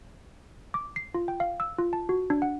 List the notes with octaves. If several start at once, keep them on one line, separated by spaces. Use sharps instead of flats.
D6
C7
F4
G5
F5
E6
F4
A5
F#4
D4
F#5